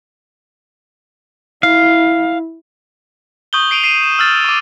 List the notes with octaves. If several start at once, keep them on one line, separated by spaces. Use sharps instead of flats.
E4 F5
C#6 D#6 G6 F#7 G7
C7 D7 D#7 F7
C7 D#7 E7
C7 E7
E6 F6 A6
C#6 D6